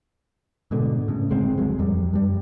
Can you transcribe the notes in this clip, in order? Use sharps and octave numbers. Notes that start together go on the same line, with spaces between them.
G#2 B2 D3
A2 C#3
G1 G#3 C4
D1 F#3 G#3
F2 G3
F#2 G3